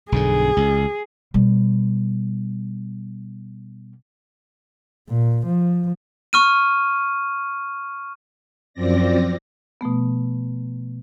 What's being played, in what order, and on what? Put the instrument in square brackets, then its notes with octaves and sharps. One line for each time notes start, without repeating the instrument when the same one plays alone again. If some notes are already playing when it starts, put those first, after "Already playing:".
[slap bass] B1 G2 D3 [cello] G#4
[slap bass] C#2
[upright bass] B2 G3
[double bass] A#2
F3
[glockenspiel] C#6 F6 D#7
[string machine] F#2 F3 C4 D5 A#6
[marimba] B2 F3 A3 B3